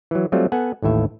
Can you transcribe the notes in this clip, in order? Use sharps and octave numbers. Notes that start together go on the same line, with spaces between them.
E3 F#3
F#3 G3 A3 C4 F4
B3 A4 F#5 G#5
A1 D#2 A2 E5